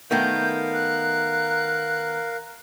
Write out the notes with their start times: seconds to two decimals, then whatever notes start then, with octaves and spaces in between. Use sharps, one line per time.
0.11 D#3 A3 B3 A#4 F5 G6
0.74 F#6